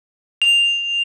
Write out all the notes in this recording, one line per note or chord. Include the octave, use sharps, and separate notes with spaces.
F7